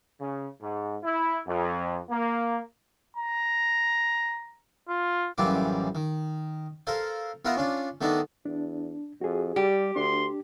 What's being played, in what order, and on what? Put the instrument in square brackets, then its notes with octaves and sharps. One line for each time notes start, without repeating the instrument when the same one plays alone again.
[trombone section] C#3
G#2
E4
F2
A#3
[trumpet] A#5
F4
[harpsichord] A1 F#2 E3 G3 F4 D6
D#3
A4 A#4 C5 F5
B3 F4 A#4 E5 F#5
C#4 D4 F4
D#3 A3 B3 D4 D#4
[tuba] E2 [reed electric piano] D4
[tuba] F2 [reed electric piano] F#4 G#4
[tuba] G3 [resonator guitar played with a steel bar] G4
[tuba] D2 [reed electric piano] D4 [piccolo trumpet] C6